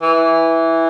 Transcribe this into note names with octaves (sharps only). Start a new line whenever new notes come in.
E3